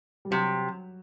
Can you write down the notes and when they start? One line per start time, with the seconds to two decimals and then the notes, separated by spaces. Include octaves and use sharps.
0.25 G3
0.31 C3 F#3